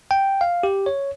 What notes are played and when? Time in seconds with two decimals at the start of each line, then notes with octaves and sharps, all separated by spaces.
0.11 G5
0.41 F5
0.63 G4
0.86 C#5